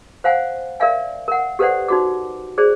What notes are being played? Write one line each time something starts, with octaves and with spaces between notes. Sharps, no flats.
C5 F5 F#5 G#5
A#4 D5 E5 F5 G#5
A#4 F#5
G4 A4 B4 C5 D5 F#5
D#4 F#4 D6
G#4 C5 D5